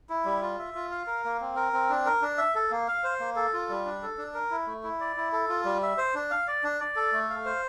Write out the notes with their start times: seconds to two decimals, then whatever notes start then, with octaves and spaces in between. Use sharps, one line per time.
0.10 E4
0.25 G3
0.42 F4
0.59 E5
0.75 F4
0.91 F5
1.07 A#4
1.25 A#3
1.41 C4
1.56 A#4
1.73 C4
1.90 D4
2.06 A#4
2.22 D4
2.38 E5
2.55 A4
2.71 A#3
2.88 F5
3.04 C5
3.20 A#3
3.36 A4
3.53 F4
3.69 G3
3.85 D4
4.03 A4
4.18 D4
4.34 A#4
4.51 E4
4.67 A3
4.84 E4
5.00 D5
5.17 E4
5.33 A4
5.49 F4
5.65 G3
5.82 E5
5.98 C5
6.15 D4
6.31 F5
6.47 D5
6.64 D4
6.80 D5
6.96 A4
7.13 A3
7.30 F5
7.45 C5